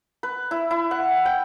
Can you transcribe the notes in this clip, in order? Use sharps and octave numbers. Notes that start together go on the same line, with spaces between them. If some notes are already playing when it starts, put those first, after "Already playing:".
B4
E4
E4
F#5
G5